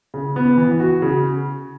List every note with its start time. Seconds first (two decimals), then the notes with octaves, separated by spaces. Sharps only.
0.14 C#3
0.36 B3
0.57 E3
0.80 F#4
1.02 C#3